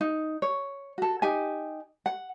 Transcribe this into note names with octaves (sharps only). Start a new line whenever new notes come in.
D#4
C#5
F#4 A4
D#4 G4 G#5
F#5